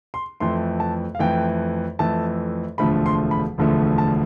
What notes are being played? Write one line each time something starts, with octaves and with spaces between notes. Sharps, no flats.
C6
F2 E3 A3 C6
A5
F5
F2 E3 A3 G5
F2 E3 A3 A5
E1 D2 D3 F3 A3 B5
C6
B5
E1 D2 D3 F3 A3
A5